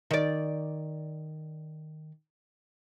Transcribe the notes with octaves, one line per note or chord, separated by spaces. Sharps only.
D#3 D5